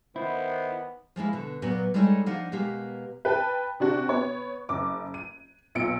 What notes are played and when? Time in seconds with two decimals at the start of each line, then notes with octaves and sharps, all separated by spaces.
0.16 D#3 B3 E4 C5
1.16 F3 G#3 A#3 E4
1.33 B2 D3
1.62 A#2 F#3 A#3 B3
1.94 G3 G#3 D#4 A4 C#5 D#5
2.26 F3 A#3 D4 D#4 F#5
2.52 B2 G#3 A#3 G4
3.25 B4 G5 A5
3.80 C3 D4 F#4
4.09 B3 C#5
4.69 F#1 D6
5.14 D#7
5.75 B1 A#2 C#7 D7